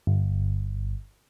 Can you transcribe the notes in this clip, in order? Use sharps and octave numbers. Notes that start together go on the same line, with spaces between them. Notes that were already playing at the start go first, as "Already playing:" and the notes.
G1